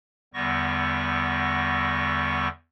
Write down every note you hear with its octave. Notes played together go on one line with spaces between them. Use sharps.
E2 D3 G3 B3 C#6 A#6